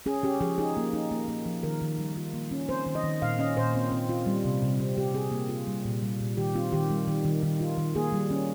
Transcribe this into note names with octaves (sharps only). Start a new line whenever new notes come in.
C#4 G#4
C#4 G4
F3 G#4
D#4 G#4
A#3
D#4
A#3
A#3
F3
D#3 A#4
D#3
G3
F4
A#3
C#4
C4 C5
D#3
D#5
D#3
A#2 F5
C#4 D#5
A#2 C5
C4
C4
F4
G3
C3
C3
C4
C4 G4
C4 G#4
A#3
F4
G3
A#2
G3
A#2
D#3 G4
C4 F4
D#3 G4
G3
D#3
D#3
D#3
F4
D#3
A#3 G#4
G3
C#4